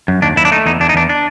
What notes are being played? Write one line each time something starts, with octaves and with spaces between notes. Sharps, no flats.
F#2
D#2 D4
D#2 E4
D4
A3 D#4
E2 D#4
E2 D4
D#4
E2 D4
D4